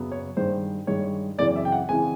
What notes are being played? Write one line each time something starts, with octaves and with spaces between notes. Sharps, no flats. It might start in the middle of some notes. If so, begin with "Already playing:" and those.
Already playing: F#2 C#3 F#3 B3
C#5
G2 D#3 G#3 C5
G2 D#3 G#3 C#5
F#2 C#3 E3 G#3 C4 D5
E5
G5
F#5
C#3 E3 G#3 C4 G#5